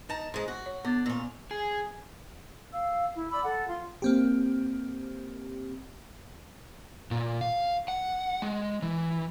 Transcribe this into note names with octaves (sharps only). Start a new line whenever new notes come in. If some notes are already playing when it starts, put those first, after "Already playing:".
D#4 A5 A#5
G#2 G#3 C6
F#4
C#5
D3 B3 D6 A6
A#2 C#4
G#4
F5 E6
E4
D5 B5 D6 E6
A4 F#5
F4 C6
A#3 C4 G4
A#2
F5
F#5
G#3
E3